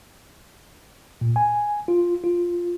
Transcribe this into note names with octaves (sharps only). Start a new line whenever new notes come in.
A#2
G#5
F4
F4